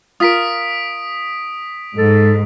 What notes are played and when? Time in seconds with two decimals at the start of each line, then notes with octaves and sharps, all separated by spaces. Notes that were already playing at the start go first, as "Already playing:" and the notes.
0.20 F4 A#4 D#6 B6 D7
1.98 G#2 A4